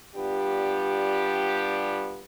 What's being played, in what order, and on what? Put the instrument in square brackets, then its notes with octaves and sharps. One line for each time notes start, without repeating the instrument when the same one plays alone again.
[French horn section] G3 B3 D4 F4 G4